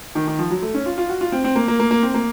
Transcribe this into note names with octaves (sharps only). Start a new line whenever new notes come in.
D#3
D#3
F3
F#3
A3
C#4
F4
F4
F#4
F4
C4
C4
A#3
A#3
A#3
A#3
C4
A#3